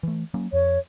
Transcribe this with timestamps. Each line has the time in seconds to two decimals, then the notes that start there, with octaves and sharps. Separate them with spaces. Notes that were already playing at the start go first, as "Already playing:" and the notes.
0.03 E3 A3
0.34 F#3 A#3 C#4
0.53 F2 C#5